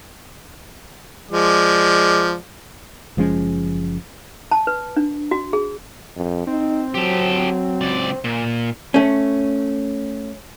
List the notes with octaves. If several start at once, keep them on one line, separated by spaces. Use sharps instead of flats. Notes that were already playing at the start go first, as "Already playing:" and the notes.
F3 G#3 D5
F#1 F3 G#3 C#4
A5
B4
D4
F#4
G#4
F2
C4 D#4
F#3 G4 A4
C#2 D5
A#2
A3 C#4